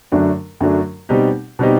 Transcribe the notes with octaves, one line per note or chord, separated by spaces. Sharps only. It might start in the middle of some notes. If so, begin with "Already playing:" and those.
F#2 D3 F#3 A3 D4
F#2 D3 F#3 A3 D4
B2 G3 C4 D#4 G4
B2 G3 C4 D#4 G4